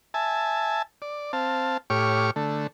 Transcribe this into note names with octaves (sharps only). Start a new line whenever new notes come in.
E5 G#5 A5
D5
C4 F5 A5
A2 G4 C#5 C#6 D6 F6
D3 A3